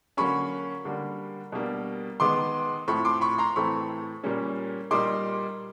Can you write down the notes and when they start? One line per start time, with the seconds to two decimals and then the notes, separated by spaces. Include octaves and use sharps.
0.17 D3 F#3 A#3 C#4 B5 C#6
0.85 D3 G3 A#3 D4
1.52 B2 G3 A#3 D4
2.20 D#3 G#3 B3 C6 D6
2.88 A2 F3 A3 C4 B5 C#6
3.05 C6 D6
3.21 B5 C#6
3.38 A#5 C6
3.56 A2 E3 A3 C4 B5 C#6
4.23 A#2 G3 A#3 C#4
4.91 A#2 G3 A#3 D#4 C6 D6